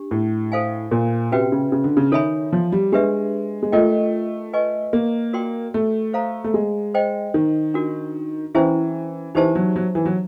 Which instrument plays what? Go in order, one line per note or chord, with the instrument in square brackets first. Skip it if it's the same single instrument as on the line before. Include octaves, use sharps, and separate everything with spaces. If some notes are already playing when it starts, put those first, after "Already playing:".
Already playing: [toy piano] D4 G4
[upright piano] A2
[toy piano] A4 C5 F5 G#5
[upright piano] A#2
[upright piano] C3 [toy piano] C#4 F#4 B4 E5 G5
[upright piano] C#3
C#3
D3
C#3
[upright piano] D#3 [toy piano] A4 C#5 E5 G#5 B5
[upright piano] F3
G3
[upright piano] G#3 [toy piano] D4 G4 B4 E5
[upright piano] G#3
[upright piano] A3 [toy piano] F4 A#4 D#5 G5
[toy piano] B4 D#5 G#5 C#6
[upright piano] A#3
[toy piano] F#4 A#4 D5 G5 C6
[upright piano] A3
[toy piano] A4 C5 F5 A#5
[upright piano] A3
G#3
[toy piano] C5 D#5 G5
[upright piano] D#3
[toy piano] D4 F#4 A#4
[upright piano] E3 [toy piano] C#4 E4 G#4 C5 E5
[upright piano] E3 [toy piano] D#4 G4 C5 E5 A5
[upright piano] F#3
F#3
E3
F#3